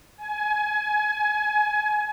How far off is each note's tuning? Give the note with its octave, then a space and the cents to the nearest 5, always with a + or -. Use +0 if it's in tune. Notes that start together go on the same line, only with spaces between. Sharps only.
G#5 +25